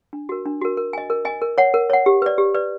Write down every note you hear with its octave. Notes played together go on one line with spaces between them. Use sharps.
D4
F#4 A#4
D4
F#4 A#4
A#4
D#5 G#5
A#4
D#5 G#5
A#4
C#5 F#5
A#4
C#5 F#5
G4
B4 D5
G4
B4 D5